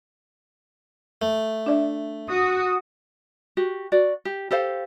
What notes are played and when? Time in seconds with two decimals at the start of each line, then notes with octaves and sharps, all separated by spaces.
1.22 A3
1.66 D4 D5 E5
2.28 F#4 D#6
3.57 F#4 G4
3.92 F#4 D5
4.25 G4
4.51 G4 A4 C5 F5